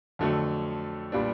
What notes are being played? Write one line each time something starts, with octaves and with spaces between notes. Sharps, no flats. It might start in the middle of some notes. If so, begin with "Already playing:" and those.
F2 D3 F#3 A3
A#2 G3 B3 D4